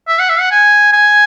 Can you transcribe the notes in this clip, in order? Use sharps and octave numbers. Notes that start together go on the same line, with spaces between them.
E5
F#5
E5
F#5
G#5
G#5